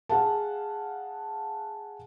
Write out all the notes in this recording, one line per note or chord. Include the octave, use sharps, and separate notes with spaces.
G#4 F5 F#5 A5